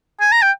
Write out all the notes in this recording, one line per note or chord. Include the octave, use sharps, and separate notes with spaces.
G#5
A#5
G5